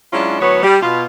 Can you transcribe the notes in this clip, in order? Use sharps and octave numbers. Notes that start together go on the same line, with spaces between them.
F#3 G#3 C#4 D4 E4 F4
D2 E3 F#3 B3 C#5
G3
B2 F4